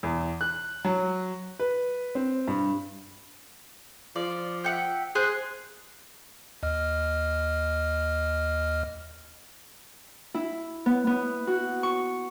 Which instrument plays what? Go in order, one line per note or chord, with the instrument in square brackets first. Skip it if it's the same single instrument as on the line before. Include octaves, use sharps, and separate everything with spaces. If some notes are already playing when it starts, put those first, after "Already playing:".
[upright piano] E2
F#6
F#3
B4
C4
G2
[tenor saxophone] F3 [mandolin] D5
[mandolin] E5 F#5 G5
[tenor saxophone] G#4 [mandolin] C5 F#6
[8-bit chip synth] D#2 D#5 F6
[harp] E4
B3
B3
F#4
C#6